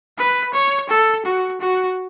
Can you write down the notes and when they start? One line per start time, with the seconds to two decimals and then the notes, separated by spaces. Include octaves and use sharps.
0.18 B4
0.54 C#5
0.89 A4
1.25 F#4
1.61 F#4